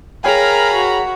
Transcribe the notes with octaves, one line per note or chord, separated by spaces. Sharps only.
G#4 A#4 C#5 F5 G5 G#5 A#5 B5
F#4